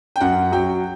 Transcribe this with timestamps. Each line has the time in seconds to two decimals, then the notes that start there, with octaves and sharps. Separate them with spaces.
0.16 G5
0.20 F#2 F#5
0.52 F#3 G5